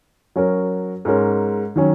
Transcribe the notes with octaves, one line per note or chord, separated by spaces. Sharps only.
F#3 C#4 F#4 A#4
G#2 G#3 C#4 A#4
D#3 F#3 C#4